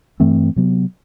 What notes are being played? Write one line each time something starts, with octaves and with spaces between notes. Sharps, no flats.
G2 E3 A3 C4
C3 F#3 B3